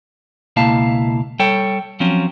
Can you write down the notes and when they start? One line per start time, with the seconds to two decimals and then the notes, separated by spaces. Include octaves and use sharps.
0.56 C#2 B2 A#3 E4 F5 A5
1.39 G3 A4 C#5 G5
2.00 F3 F#3 C4 C#4